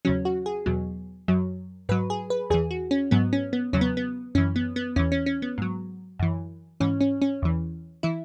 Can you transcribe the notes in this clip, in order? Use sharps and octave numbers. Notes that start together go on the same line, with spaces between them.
E2 C#3 F#3 C#4
F#4
G#4
E2 B2 F#3
F#2 F#3
G#2 F#3 B4
G#4
B4
E2 E3 G#4
F#4
C#4
G#2 F#3 B3
C#4
B3
E2 C#3 F#3 C#4
B3
B3
F#2 E3 C#4
B3
B3
E2 E3 C#4
C#4
C#4
B3
G#2 F#3
F#2 E3
G#2 E3 C#4
C#4
C#4
E2 E3
E3 E4